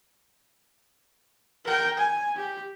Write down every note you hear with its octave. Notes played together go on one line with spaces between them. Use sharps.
A#4 G5
G#5
G4